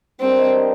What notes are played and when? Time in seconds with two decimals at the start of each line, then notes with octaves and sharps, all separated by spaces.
0.20 G3 C4 D4 G4 A#4 D#5